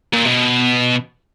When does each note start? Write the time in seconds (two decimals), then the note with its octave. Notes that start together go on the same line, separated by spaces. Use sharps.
0.13 A#2
0.25 B2